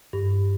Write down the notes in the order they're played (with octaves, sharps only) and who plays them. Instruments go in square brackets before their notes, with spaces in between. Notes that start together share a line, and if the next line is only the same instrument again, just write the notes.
[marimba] G2